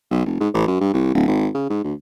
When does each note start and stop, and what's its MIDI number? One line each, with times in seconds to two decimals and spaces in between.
0.10 0.25 35
0.25 0.37 29
0.40 0.48 44
0.54 0.63 33
0.67 0.75 42
0.80 0.92 43
0.94 1.13 36
1.14 1.26 26
1.27 1.48 32
1.54 1.67 49
1.70 1.81 44
1.84 1.94 38